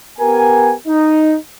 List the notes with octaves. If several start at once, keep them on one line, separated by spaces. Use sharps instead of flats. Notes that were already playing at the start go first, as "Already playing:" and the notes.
B3 G4 A#4 G#5
D#4